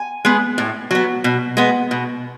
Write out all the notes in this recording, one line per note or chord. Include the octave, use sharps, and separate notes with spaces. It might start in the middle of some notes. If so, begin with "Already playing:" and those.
Already playing: G#5
G#3 B3
A2
F#3 B3
B2
G#3 B3
B2